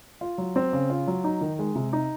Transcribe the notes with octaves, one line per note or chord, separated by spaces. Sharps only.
F4
F#3
C4
C#3
F4
F#3
D#4
D#3
G#3
C3
D#4